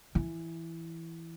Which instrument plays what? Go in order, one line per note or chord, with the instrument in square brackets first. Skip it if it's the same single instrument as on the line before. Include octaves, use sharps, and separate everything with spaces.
[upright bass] E3